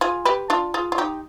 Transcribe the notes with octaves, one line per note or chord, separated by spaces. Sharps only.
F4 G#4
G4 B4
D4 F4
F4 G#4
F4
D#4 G4